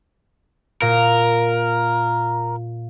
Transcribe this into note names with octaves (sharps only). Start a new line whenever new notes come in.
A#2 A#4